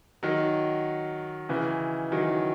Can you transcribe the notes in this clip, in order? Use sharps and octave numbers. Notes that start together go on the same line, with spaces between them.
D#3 F#3
C#3 E3
D#3 F#3